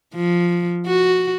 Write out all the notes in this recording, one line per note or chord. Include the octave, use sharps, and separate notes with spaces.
F3
F#4